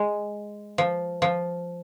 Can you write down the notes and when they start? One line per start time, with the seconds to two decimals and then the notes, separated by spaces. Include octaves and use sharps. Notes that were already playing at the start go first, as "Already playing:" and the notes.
Already playing: G#3
0.78 F3
1.22 F3